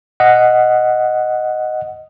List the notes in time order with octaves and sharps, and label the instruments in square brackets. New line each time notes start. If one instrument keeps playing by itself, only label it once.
[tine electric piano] D#5 F#5